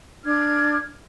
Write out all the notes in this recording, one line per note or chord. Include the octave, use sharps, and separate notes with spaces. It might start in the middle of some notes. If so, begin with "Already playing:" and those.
D4 D6 F6 G#6